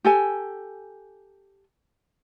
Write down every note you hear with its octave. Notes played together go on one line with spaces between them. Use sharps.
G4 A4 G#5